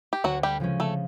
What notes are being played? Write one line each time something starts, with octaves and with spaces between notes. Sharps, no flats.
G4
D2 F#3 F#4
G3 G4
C#3 F3 G#3 C#4
A3 A4